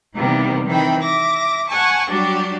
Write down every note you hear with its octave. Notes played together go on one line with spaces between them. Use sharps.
C3 D#3 E3 G3 A#3 B3
D#3 E3 C4 G5 B5
E5 D6 A#6
F#5 G#5 A5 C#6
F#3 G3 D4 F#4 G4